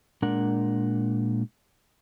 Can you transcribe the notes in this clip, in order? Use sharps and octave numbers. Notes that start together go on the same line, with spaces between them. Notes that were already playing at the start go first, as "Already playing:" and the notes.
A#2 G#3 D4 A#4 F#5